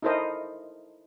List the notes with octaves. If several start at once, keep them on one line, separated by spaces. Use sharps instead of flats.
D#4 E4 A4 A#4 C5 D#5